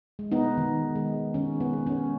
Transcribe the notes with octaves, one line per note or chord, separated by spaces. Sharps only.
G#3
B3 D#4
D#3
G#3
D#3 C#4
B3
G#3
C#4